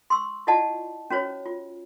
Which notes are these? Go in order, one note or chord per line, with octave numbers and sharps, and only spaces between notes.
C6 C#6 E6
E4 F4 D5 D#5 F#5 A5
C#4 F#4 C5 C#5
F4